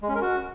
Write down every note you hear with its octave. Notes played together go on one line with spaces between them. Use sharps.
G#3
C#4
A#4
F#4